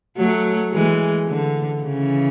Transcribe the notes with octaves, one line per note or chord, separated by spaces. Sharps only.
F#3 A3
E3 G#3
D3
C#3 E3